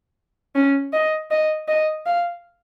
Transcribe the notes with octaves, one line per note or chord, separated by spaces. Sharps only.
C#4
D#5
D#5
D#5
F5